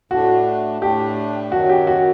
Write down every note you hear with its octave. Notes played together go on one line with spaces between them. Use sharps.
A2 A3 D4 F#4
A2 A3 D4 G4
F#2 D#3 F#3 F#4
G4
F#4